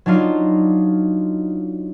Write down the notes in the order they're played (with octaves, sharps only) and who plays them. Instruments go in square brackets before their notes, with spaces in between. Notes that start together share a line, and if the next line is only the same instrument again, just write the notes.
[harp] F#3 D4 D#4 F4